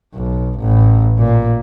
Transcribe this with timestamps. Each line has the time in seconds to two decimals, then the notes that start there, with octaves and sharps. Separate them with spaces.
0.15 B1
0.59 A1
1.19 A#2